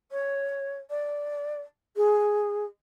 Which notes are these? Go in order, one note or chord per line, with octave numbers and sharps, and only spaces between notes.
C#5
D5
G#4